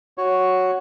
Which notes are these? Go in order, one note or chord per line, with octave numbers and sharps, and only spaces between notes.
F#4 C#5